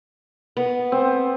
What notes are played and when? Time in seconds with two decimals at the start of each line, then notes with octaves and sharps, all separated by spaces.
0.57 B3
0.92 C4